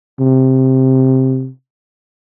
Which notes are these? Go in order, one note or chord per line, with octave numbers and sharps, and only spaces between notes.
C3